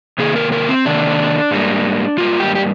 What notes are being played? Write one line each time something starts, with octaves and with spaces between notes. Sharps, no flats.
C3 D#3 A#3 G#4
A#4
A#4
C4
C3 D#3 A#3 D4
G#2 G3 A#3
G#2 G3 A#3 F4
G4
G4